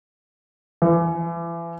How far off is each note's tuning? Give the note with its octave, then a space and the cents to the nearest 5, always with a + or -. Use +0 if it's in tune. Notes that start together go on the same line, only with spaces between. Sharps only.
E3 +35